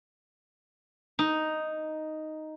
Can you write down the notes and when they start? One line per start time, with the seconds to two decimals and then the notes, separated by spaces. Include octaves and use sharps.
1.19 D#4